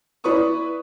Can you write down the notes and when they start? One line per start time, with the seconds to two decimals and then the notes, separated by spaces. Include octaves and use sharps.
0.24 E4 B4 D5 C#6 D#6